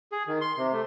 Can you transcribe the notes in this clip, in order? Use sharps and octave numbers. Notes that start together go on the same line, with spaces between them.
G#4
D#3
C6
C3
A3